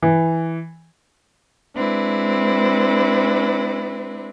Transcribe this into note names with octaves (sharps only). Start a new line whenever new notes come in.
E3
G#3 C4 D4 E4 B4